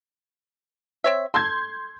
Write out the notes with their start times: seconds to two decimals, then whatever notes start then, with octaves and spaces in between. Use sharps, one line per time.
1.04 C4 C#5 E5
1.34 A4 C6 G6 G#6